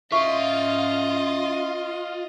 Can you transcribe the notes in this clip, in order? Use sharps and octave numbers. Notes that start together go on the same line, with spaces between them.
C#4 F4 D#5 E5 C#6